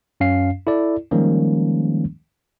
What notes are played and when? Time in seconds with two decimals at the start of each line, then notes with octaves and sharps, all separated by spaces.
0.20 F#2 C#4 F5 C7
0.67 E4 A4 D5
1.11 D#3 F3 G3 G#3 A#3 C#4